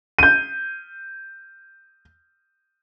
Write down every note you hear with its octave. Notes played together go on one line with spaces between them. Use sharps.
G6 D#7